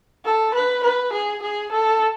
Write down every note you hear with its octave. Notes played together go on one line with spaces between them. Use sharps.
A4
B4
B4
G#4
G#4
A4